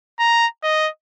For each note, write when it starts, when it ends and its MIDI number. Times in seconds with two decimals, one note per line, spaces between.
0.19 0.47 82
0.64 0.89 75